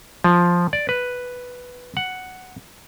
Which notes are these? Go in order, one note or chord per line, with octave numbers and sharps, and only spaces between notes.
F3
D5
B4
F#5